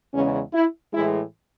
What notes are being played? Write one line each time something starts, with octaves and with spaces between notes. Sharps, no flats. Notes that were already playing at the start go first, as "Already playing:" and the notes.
E2 C#3 G#3 C#4
E4
A2 E3 G#3 E4